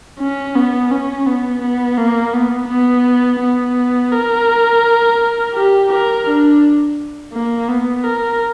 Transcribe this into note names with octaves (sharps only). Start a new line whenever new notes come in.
C#4
B3
C#4
B3
B3
A#3
B3
B3
B3
A#4
G4
A#4
D4
A#3
B3
A#4